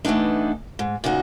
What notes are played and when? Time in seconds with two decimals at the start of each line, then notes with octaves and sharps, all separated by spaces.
0.05 E3 A3 B3 D4 D#4
0.79 G#2
1.04 A#2 C#3 D#4 F#4